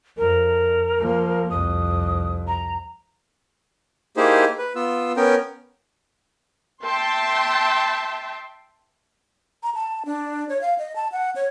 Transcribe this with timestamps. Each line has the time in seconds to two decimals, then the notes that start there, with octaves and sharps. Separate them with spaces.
0.17 F2 A#4
0.98 F3 A#3
1.50 C2 F2 D#6
2.48 A#5
4.17 A#3 D#4 E4 G4 G#4 C5
4.58 B4
4.75 B3 F4 E6
5.17 B3 C#4 A#4 G5
6.83 E5 G5 A5 C6
9.63 A#5
9.75 A5
10.05 D4
10.49 C#5
10.61 F5
10.78 D#5
10.96 A5
11.12 F#5
11.36 C#5